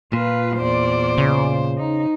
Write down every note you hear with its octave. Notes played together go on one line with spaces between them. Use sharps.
A#2 F4 B4
E2 C5 D5
C#3
D#4